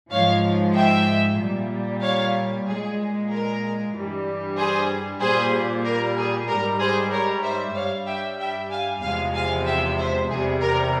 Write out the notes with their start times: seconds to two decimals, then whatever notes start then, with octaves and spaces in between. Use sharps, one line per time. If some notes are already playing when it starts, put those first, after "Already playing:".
0.11 G#2 F3 G#3 C#5 F5
0.76 E5 G5
1.39 A#2 G3
2.02 C#5 F5
2.66 A#2 G#3 G#4
3.31 A#4
3.93 G2 E3 G3
4.57 G#4 C5
5.20 A#2 G3 G#4 C5
5.85 A#4
6.16 G#4
6.49 G#2 G3 A#4
6.80 G#4 C5
7.11 A#4 C#5
7.44 C5 E5
7.75 G2 G3 C#5 F5
8.07 E5 G5
8.39 E5 G5
8.70 F5 G#5
9.02 E2 C3 F3 G#3 F5 G#5
9.34 F5 G#5
9.66 E5 G5
9.98 C5 E5
10.30 E2 C3 G3 G#4
10.61 A#4